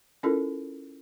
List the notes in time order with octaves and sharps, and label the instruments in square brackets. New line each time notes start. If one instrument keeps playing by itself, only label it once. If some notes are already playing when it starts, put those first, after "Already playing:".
[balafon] C#4 E4 F4 A4 A#4